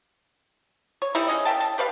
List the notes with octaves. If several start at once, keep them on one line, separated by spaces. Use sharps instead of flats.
C#5
E3 G3 D#4 E4
G#3 C#4 D#5
A#4 E5 G5 A5
A5
G4 B4 C#5 F5